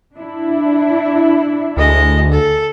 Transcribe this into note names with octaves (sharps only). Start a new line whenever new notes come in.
D4 E4
D2 G#3 D#5
A4